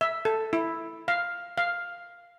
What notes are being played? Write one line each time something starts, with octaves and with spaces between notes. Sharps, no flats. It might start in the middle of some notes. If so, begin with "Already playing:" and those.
E5
A4
E4
F5
F5